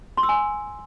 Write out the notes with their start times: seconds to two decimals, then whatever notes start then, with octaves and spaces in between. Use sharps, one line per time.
0.17 C6
0.23 E6
0.29 G#5